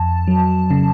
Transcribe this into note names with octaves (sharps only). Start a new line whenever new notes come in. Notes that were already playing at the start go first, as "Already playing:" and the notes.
Already playing: F2 A5
F#3
C#3